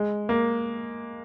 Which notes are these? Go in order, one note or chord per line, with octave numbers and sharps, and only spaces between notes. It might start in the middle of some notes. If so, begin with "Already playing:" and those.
Already playing: G#3
A#3